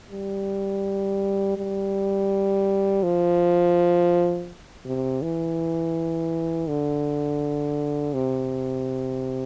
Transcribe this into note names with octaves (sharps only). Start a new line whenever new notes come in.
G3
G3
F3
C3
E3
D3
C3